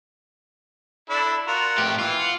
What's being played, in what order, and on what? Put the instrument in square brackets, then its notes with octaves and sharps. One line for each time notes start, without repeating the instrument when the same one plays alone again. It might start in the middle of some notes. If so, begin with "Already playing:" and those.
[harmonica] D4 E4 A4
F4 F#4 A#4
[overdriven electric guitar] A2 G4
[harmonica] E3 [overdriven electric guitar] F4
[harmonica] F#5